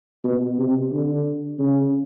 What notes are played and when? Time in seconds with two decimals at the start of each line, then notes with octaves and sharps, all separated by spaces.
0.24 B2
0.59 C3
0.92 D3
1.58 C#3